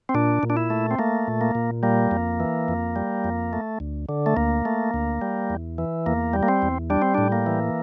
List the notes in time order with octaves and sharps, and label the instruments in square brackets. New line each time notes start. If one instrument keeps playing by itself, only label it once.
[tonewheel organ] C4
A#2 D4
A#2
D4
E4
A3
C4
A3 A#3
A#2
A#3
A#2
G3 A#3
F2
E3
F2
G3
F2
A3
D2
D3
A3
D2 A#3
A3
D2
G3
E2
E3
E2 A#3
G3
A#3
C4
E2
G3 D4
C4
A2 D4
A#3
E3